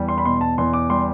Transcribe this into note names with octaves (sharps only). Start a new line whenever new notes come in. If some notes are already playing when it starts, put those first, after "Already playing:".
Already playing: E2 G3
C6
B5
B2 C6
A5
E2 C6
D6
G3 C6